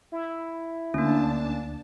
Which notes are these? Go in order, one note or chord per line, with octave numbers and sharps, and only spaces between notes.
E4
D2 A#3 C#4 D4 A5